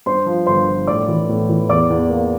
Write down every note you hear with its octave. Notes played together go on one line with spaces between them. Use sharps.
G2 C5 C6
F3
G1 C5 C6
F3
A2 D5 D6
E3
A2
E3
E2 D5 D6
E2
A#3